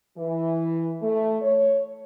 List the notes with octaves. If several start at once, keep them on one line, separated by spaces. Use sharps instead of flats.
E3
A3
C#5